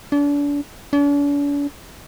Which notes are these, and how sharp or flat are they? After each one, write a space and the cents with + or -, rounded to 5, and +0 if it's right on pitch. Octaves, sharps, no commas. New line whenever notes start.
D4 -35
D4 -45